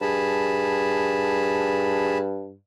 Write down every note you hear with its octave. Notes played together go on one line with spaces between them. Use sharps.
G2 G#4 A5 B5